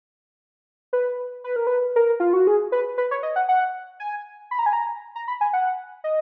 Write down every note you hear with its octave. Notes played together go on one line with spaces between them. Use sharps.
B4
B4
A#4
B4
A#4
F4
F#4
G#4
B4
B4
C#5
D#5
F#5
F#5
G#5
B5
A#5
G#5
A#5
A#5
B5
G#5
F#5
D#5